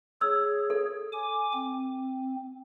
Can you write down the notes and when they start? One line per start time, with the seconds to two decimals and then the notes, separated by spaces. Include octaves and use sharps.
0.21 G#4 C#5 E6
0.70 A4
1.12 G#5 D6
1.53 C4